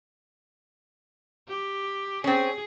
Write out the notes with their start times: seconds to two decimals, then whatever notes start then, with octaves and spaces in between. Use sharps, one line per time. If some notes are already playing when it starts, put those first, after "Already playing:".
1.48 G4
2.24 C4 C#4 G#4